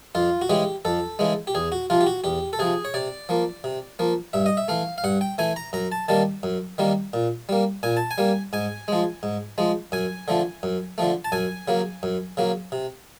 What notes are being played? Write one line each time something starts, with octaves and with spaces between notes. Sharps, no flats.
F2 F4
F#4
C#3 E3 G#3 G4
F2 A4
C#3 E3 G#3
G4
E2 G#4
F#4
C3 F3 F4
G4
F#4
E2 G4
A4
C3 F3 G#4
C#5
C3 D5
F3 A#3
C3
F3 A#3
G2 E5
D#5
E5
E3 A3 F5
F5
G2 F#5
G5
E3 A3 G#5
A#5
F#2 A#5
A5
D#3 G3 A#3 A5
F#2
D#3 G3 A#3
A#2
G3 A#3
A#2 G#5
A5
G#5
G3 A#3
G#2 G#5
F3 G#3
G#2
F3 G#3
F#2 G#5
D3 F3 A3
F#2
D3 F3 A3
A5
F#2 G#5
C#3 F#3 A#3
F#2
C#3 F#3 A#3
C3